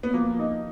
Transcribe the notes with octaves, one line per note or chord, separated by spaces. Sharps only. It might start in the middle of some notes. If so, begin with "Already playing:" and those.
B3
F3 A#3
D#4